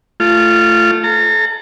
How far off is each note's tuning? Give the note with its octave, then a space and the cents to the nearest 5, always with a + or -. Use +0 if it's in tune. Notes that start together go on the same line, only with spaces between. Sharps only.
A3 +5 F4 -20
A4 -35 A#5 -40